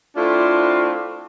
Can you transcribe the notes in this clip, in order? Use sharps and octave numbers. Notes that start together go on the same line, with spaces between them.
A3 C4 D4 E4 F4